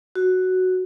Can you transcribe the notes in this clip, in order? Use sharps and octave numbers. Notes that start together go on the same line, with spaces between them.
F#4